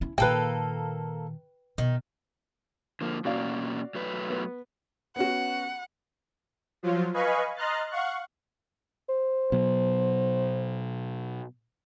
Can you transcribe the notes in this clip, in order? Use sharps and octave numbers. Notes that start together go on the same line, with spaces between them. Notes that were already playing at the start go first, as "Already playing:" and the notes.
C#4 E4
A#2 D#3 A#3 A4 B4 G5
B2 D#3
D3 F3 A#3
B2 A#3 C#4 F#4 D5 F5
F#3 A3 B4
B3
B3 C#4 F#4 F#5
F3 F#3 F4
B4 D#5 F5 G#5 B5 C#6
D#5 A#5 C6 F6 F#6 A6
F5 F#5 C#6 F#6
C5
B2 F#3